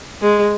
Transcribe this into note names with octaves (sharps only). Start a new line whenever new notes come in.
G#3